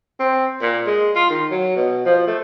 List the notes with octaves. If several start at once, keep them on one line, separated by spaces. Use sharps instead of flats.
C4
A#2
G#3
F4
D#3
F#3
B2
F3
A3